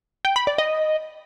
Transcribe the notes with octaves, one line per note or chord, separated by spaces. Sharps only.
G5
B5
D5
D#5